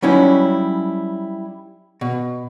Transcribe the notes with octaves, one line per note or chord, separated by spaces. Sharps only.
F#3 G3 C#4 D#4 E4
B2